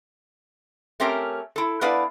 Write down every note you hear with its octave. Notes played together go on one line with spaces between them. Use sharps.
A3 C4 C#4 G4 A#4
E4 A4
B3 D4 E4 B4 D5 F5